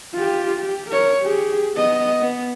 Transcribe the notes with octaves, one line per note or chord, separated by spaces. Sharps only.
F4 G4
G4
A#4 C#5
G4 G#4
B3 D#5
B3